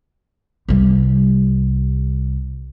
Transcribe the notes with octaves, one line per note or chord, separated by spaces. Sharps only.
C2 G3